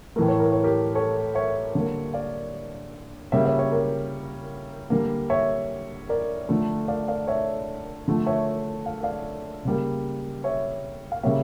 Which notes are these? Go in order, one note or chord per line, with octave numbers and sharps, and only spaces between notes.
A2 E3 A3 A#4
C#5
A#4
C#5
G4 A#4
A4 C#5
C#5 E5
D3 G3 A#3
D5 F5
C#3 G3 A#3 C#5 E5
C#5 E5
C#5 E5
G4 A#4
D3 G3 A#3
C#5 E5
A#4 D5
D3 F3 A3
D5 F5
D5 F5
C#5 E5
D3 F3 A3
C#5 E5
F5
D5 F5
C#3 G3 A#3
C#5 E5
F5
C#3 G3 A#3 C#5 E5